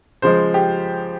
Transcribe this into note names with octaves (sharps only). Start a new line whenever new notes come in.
C#3 F3 G#3 C5
G4